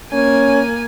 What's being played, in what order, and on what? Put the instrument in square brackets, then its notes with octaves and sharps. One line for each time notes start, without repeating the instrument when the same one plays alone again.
[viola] A#3 G#5 [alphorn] C#4